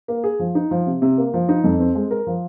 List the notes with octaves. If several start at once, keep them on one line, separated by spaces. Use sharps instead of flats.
A#3
G#4
F3
D#4
F3
C3
C3
A#3
F3
D#4
F2
C4
G#3
A#4
F3